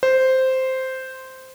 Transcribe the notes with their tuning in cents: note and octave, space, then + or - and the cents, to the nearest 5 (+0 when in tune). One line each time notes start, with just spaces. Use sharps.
C5 -5